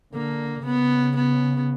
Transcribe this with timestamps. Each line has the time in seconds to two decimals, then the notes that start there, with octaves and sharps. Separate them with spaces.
0.13 D3 A#3
0.64 C#3 B3
1.15 B3